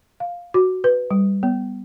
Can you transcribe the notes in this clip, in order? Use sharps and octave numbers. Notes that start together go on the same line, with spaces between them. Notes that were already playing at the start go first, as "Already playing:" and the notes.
F5
F#4
B4
G3
B3